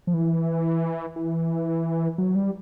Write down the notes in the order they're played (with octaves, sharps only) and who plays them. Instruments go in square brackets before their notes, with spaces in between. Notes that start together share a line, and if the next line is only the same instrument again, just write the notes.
[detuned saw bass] F3
E3
E3
F#3
G3